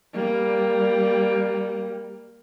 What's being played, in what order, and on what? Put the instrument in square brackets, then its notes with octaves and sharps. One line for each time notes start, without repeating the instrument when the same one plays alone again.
[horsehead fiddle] G3 A#3